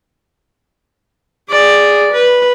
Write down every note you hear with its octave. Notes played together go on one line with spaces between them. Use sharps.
G#4 D5
B4